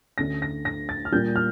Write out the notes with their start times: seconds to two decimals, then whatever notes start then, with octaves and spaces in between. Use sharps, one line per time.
0.18 D2 D3 A3 C#4 A#6
0.42 A#6
0.65 A#6
0.89 A6
1.05 F6
1.12 A#2 G3 A#3 G6
1.36 F6